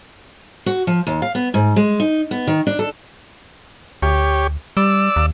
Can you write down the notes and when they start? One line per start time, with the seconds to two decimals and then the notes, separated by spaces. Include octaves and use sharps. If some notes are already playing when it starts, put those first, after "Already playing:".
0.66 F#4
0.87 F3
1.07 D#2
1.22 F5
1.35 B3
1.54 G#2
1.76 G#3
2.00 D#4
2.31 B3
2.47 D#3
2.67 D4
2.79 A4
4.02 D2 G4 C#5
4.77 G3 D5 E6
5.16 D#2